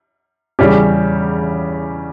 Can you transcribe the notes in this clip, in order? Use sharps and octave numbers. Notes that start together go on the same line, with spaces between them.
E2 C#3 G3 C#4 G4